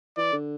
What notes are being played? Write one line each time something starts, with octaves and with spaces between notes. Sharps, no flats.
E3 D5
D3